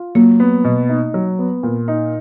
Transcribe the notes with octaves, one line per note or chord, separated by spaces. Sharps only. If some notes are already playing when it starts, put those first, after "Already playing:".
Already playing: F4
F#3 A#3
B3
B2
D#4
F#3
B3
A#2
D#4